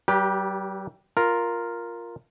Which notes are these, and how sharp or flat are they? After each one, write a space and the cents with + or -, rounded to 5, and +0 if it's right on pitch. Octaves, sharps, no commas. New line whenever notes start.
G3 -45 G4 +0 B4 -35
F4 +0 A#4 +0